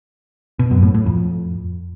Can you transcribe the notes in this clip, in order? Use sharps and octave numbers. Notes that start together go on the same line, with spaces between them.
B2
F#2
A2
A2
F2